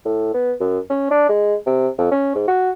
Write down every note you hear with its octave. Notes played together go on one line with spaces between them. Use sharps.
A2
B3
F#2
C#4
D4
G#3
C3
F2
C#4
G#2
F#4